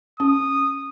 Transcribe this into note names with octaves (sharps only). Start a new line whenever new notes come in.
C#4 D#6